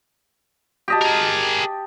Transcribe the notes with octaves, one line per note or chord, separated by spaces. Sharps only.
G4 D#5 A5
G#4 A#4